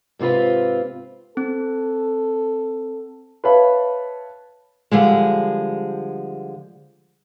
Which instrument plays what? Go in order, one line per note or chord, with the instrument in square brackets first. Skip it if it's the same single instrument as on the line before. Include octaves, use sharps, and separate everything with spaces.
[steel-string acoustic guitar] G#2 C3 C4 F4 B4
[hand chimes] C4 [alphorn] A4
[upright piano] B4 C#5 E5 F5 A5 B5
[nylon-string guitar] D3 F3 G3 G#3